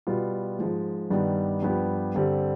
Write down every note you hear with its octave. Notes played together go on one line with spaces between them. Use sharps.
B2 G3 B3 F4
G#2 F3 G#3
G2 D#3 G3 B3 D4
G2 F3 B3 D4 G4
G2 D3 G3 C4 G4